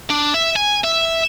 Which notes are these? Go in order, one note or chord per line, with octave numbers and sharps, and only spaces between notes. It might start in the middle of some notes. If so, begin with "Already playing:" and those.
D4
E5
G#5
E5